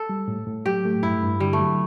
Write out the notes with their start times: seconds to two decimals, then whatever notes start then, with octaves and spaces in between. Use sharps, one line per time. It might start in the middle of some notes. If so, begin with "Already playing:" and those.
Already playing: A4
0.09 G3
0.28 A2
0.47 A2
0.66 F#3 G4
0.85 A3
1.03 G2 E4
1.22 G2
1.40 D3 G3
1.53 A3
1.60 F#3